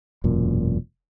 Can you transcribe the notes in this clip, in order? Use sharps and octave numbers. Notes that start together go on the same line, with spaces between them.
E1 F#2 A#2